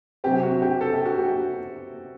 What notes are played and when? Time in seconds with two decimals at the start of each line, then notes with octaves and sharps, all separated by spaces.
0.24 C3 F#3 C4 G4
0.43 F#4
0.62 G4
0.81 A4
0.93 G4
1.05 F#4
1.18 G4